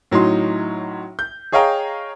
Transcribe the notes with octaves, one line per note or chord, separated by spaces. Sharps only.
A2 F#3 C#4 D#4 C6
G6
G#4 C#5 D#5 F5 G5 A#5